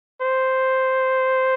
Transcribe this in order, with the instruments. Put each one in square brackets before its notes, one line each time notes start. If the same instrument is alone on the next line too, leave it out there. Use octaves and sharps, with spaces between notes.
[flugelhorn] C5